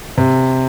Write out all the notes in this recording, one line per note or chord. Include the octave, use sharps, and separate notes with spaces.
C3